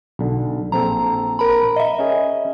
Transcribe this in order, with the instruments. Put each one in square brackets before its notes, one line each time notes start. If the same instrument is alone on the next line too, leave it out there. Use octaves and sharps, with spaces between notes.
[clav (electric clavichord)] B1 D3
[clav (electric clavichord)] A#1 C4 A4 [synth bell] A#5
[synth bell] A#4 A#5 B5
D#5 E5
[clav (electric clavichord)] C#4 G#4